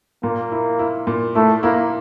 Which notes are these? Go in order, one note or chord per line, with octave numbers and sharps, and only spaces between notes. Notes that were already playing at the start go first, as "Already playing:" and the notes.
A#2 A#3
E4
E4
A#2
A3 E4
A#3 E4